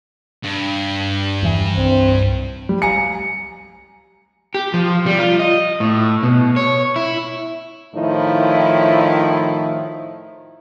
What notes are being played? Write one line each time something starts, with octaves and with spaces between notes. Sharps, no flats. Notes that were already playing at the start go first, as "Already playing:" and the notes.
G2
E2 E3
C2 C4
G3
F5 G#5 A#5 C#7
G4
F3
G3
F4
D#5
A2
B2
C#5
E4
A2 D#3 F3 D#4 E4